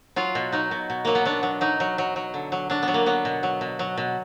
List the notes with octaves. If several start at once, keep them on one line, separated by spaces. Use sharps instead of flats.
F#3 F4
B2
F#3 D#4
B2
B2
F#3 A#3
B3
F#3 D4
F#3
F#3 D#4
F#3
F#3
F#3
D3
F#3
F#3 D4
B3
F#3
A#3
F#3 B3
B2
F#3
B2
F#3
B2